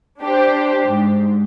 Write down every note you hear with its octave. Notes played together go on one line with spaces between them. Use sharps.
D4 G4 C5
G#2